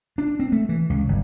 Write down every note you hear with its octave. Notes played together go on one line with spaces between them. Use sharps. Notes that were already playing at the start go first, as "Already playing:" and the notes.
D4
C4
A3
E3
C#2
G1